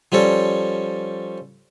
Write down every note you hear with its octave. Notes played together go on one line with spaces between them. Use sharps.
F3 G3 C#4 A4